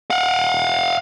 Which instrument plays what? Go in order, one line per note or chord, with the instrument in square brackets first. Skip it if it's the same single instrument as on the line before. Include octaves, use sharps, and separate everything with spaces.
[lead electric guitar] F5 F#5